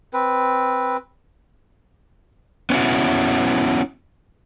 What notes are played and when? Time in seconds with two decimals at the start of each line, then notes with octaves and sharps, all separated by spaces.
0.13 C4 B4
2.70 B3 C#4 E4 F#4